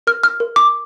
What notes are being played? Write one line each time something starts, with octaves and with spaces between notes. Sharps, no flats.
A#4 F6
F6
A#4
D6